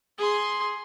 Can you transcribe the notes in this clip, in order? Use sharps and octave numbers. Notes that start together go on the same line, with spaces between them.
G#4 C6